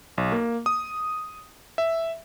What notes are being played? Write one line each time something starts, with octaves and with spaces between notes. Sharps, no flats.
B1
A#3
D#6
E5